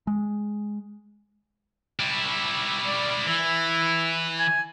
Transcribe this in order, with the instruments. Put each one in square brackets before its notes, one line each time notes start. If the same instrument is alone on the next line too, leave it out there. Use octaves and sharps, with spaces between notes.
[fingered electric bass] G#3
[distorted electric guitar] G3 E4
[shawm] D5
[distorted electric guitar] E3 [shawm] E4
[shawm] G#5